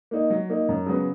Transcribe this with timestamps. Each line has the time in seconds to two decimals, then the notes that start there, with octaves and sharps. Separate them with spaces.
0.11 A#3 D#4
0.30 F#3
0.49 A#3 D#4
0.69 F#2
0.86 C#3 F#3 B3